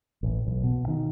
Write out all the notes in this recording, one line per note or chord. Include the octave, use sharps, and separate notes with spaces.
A1
B1
B2
D#3